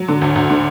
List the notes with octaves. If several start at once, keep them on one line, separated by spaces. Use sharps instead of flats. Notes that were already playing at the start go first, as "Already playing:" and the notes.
Already playing: F#3
D3
D2
D2
D3